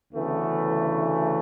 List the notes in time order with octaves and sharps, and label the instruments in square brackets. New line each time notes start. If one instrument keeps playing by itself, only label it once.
[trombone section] D2 C#3 E3 A3 B3